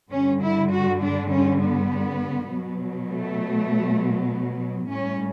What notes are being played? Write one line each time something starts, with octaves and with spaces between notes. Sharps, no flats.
G2 D3 G3 C#4
E4
F#4
D4
C#4
B3
B2 F#3
A3
A2 G3 C#4